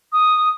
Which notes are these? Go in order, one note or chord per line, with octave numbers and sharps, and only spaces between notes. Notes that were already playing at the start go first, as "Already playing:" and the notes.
D#6